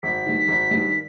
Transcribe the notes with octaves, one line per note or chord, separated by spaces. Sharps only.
G#1 B6
G2 D#3
G#1
G2 D#3